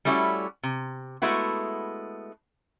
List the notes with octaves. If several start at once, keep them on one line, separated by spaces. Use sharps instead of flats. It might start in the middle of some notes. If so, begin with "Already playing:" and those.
G3 A3 C#4 E4 F#4
C3
G#3 A3 B3 E4 F#4